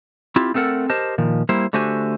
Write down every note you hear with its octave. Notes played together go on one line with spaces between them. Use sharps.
C4 E4 F4 G4
A3 C4 A4 A#4 F#5
G4 A#4 C5 D#5 A5
A#2 D#3 F3
G3 A#3 E4 C5
D3 A3 F#4 G4 C5 G#5